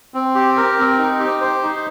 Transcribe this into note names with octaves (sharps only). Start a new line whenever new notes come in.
C4
G4
A#4
C4
D#4
G4
C5
D#4